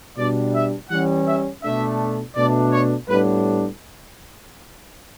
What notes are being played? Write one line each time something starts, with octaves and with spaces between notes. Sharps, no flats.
B2 G3 D4 D5
E5
E3 G3 C#4 F#5
E5
B2 A3 D4 E5
B2 A3 D4 D5
C#5
A2 G3 B3 D4 B4